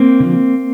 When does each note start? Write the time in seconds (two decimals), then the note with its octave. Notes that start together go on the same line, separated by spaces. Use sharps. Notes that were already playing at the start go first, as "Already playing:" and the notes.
Already playing: A#3 C4
0.20 D3 F3